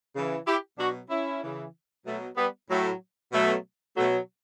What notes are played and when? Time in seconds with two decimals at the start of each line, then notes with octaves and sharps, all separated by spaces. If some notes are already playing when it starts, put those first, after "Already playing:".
0.15 C#3 E3
0.47 E4 G4
0.78 B2 F#3 D4 F#4
1.10 C#4 E4
1.42 C#3 E3
2.06 B2 F#3 A3
2.37 G3 B3
2.69 A2 F#3 A3
3.33 B2 F#3 A3
3.96 B2 F#3 A3